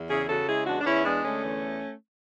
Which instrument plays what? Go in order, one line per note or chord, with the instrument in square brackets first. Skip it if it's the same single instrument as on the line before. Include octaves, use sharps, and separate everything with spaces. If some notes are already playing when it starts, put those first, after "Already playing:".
Already playing: [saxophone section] E2
C#3 E4 G#4
C#3 F#4 A4
G#3 E4 G#4
E2 D4 F#4
D4
E2 C#4 E4
G#3 B3 D4
D3 A3 C#4
E2